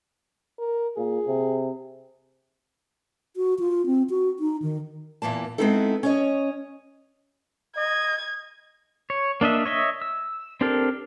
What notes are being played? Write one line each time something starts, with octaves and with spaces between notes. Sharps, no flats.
A#4
A#2 G#4
C3
F#4
F4
C4
F#4
D#4
D#3
E2 A#2 E3 A#3 A5
G#3 B3 C4 D#4 E4 A4
C#4 C#5 D#5
D#5 G#6
C#5
A#3 D4 D#5 E5
C#5 D#5 E5
E6
C4 D4 G4 A4 A#4